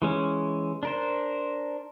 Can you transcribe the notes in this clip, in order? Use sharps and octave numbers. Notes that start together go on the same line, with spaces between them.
E3 G#3 C#4
D4 A#4 C5